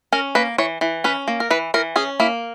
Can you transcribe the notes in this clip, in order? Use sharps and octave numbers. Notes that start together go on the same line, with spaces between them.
C#4 A#4
A#3 B4
E3 C#5
E3
C#4 B4
A#3
A#4
E3 B4
E3 A#4
C#4 G#4
A#3 E4